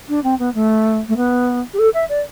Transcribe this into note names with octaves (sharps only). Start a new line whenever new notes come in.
D4
C4
B3
A3
A3
B3
G4
A4
E5
D5